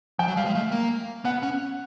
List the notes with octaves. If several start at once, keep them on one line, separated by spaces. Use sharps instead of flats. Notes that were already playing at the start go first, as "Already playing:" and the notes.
F3 G5
F#3
G3 F5
G#3
A3
A#3
B3 F#5
C#4